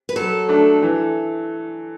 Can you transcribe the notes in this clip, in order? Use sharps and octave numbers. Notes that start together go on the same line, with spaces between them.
B4
F#3 A4
A3 D4
E3